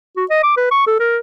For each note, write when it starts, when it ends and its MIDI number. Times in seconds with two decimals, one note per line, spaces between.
0.17 0.25 66
0.30 0.40 75
0.43 0.56 86
0.57 0.70 71
0.71 0.87 85
0.87 0.98 69
1.00 1.18 70